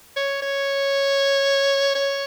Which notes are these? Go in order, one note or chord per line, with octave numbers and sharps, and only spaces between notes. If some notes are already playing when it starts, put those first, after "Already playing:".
C#5
C#5
C#5